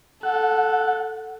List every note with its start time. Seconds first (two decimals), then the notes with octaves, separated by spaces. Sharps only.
0.23 A4 F#5